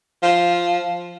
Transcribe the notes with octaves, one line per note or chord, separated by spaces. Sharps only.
F3